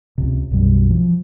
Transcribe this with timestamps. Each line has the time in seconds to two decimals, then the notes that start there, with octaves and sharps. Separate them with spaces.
0.18 C#2 C3
0.51 B1 F#2 B2 G3
0.90 F3